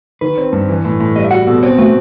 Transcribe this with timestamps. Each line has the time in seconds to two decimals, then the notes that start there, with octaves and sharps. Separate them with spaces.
0.21 D#3 B4
0.38 C4
0.52 G2
0.69 E3
0.85 A2
1.00 A2
1.16 G3 D#5
1.24 E5
1.31 F#4 F#5
1.47 B2 A4
1.63 B3 C4
1.78 A3 F#4